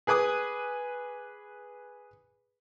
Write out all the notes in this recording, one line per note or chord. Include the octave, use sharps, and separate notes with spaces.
G#4 B4 G#5 D6 D#6